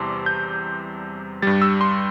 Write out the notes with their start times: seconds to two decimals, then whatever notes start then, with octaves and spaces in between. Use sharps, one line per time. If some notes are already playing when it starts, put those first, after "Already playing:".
Already playing: E2 C3 G3 A5 C6 D6
0.26 G6
1.42 G2 G3 A6
1.62 E6
1.81 C6